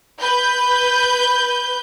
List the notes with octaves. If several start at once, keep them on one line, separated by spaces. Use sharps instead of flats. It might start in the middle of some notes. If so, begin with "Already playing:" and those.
B4 G6